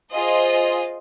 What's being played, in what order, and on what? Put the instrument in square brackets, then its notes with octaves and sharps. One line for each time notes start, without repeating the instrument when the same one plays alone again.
[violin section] F4 G#4 C5 D#5